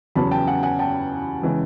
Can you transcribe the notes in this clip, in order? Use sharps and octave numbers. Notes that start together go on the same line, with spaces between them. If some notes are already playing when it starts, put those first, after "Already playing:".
E2 C#3 F#3 B3 A5 B5
G5 A5
F#5 G#5
F#5 G#5
G5 A5
C#3 E3 G#3